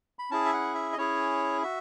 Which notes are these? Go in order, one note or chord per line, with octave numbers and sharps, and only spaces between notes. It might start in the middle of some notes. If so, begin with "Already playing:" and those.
B5
C#4 E4 G#4 A5
E5
F#5
E5
D#5
C#4 E4 G#4 C#5
F#4 E5